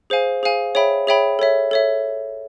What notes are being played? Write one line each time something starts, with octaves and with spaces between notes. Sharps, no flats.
G#4 C5 F5 G#5
G#4 C5 F5 G#5
G#4 C#5 E5 G5 B5
G#4 C#5 E5 G5 B5
A4 C#5 E5
A4 C#5 E5